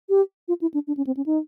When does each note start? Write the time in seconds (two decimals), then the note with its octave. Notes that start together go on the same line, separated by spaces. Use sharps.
0.09 G4
0.48 F4
0.61 E4
0.74 D4
0.87 D4
0.97 C#4
1.07 C4
1.17 C#4
1.26 D#4